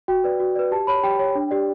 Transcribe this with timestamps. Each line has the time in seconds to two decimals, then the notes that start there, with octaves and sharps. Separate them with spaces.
0.08 F#4 G5
0.24 B4 D5
0.40 F#4
0.56 B4 D5
0.71 G4 A5
0.87 C#5 B5
1.03 G4 G5
1.19 C#5
1.35 D4
1.51 G4 D5